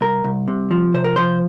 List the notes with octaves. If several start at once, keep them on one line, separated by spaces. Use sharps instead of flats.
C2 A#4
C2
C3
F3
C3 C5
A#4
F3 C5